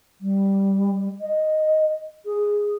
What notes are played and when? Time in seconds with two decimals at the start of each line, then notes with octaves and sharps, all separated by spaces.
0.21 G3
1.21 D#5
2.25 G#4